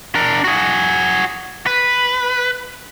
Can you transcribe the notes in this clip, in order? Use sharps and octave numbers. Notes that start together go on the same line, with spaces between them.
D4 A#4
F#4 G#4
B4